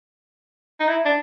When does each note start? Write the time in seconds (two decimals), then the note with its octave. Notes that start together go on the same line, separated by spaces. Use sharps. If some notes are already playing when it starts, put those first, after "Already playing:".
0.80 D#4
0.89 E4
1.06 D4